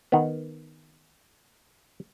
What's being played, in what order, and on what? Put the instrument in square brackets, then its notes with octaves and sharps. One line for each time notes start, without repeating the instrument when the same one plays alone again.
[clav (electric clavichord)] D#3 B3